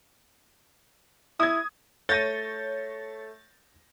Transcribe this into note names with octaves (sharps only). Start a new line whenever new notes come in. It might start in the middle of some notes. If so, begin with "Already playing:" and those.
E4 D#6 G#6
A3 C#5 G6 A6 A#6 D#7